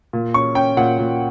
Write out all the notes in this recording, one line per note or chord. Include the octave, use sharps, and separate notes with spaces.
A#2
C#4 C#6
C#4 G5
A#2 F#5
A#2